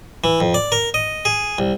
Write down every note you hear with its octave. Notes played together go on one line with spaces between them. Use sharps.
E3
F2
D5
A#4
D#5
G#4
C2